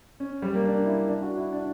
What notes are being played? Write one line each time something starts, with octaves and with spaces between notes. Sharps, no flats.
C#4
G3
A#3
D4
E4
D4
F#4
E4
D4